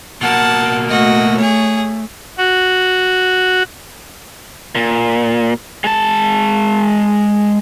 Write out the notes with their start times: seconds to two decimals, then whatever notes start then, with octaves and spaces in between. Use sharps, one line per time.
0.21 B2 A#3 F#5 A5
0.89 A3 F#4 D#5
1.37 G#4 C#5
2.37 F#4
4.75 A#2
5.84 G#3 A5